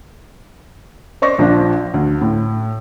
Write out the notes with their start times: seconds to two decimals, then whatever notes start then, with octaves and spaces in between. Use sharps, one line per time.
1.22 C5 D5 C#6 A#6
1.38 A#1 F3 D4
1.94 D2
2.21 A2